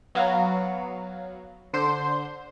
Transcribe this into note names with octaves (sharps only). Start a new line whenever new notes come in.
F#3 B3 F#4 F5
D3 C5 C6 G6